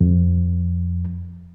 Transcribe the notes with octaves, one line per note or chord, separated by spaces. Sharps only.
F2